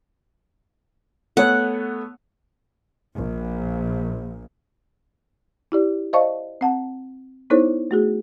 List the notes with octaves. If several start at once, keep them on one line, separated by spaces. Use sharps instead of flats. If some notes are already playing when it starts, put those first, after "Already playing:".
A3 B3 C#5 F#5
A#1
E4 G4 D5
C5 D5 D#5 F5 A5 C#6
C4 F#5 A5
B3 D#4 E4 A4 C5 C#5
A3 F#4 G#4